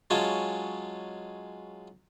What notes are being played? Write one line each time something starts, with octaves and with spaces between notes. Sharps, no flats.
F#3 G#3 C#4 F4 G#5 A5